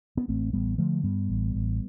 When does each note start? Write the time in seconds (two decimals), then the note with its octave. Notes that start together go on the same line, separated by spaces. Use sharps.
0.17 B3
0.28 A1 A3 C4
0.53 A1 G3 B3
0.78 D3 F3 A3
1.03 G2 G3 B3
1.29 A1
1.55 A1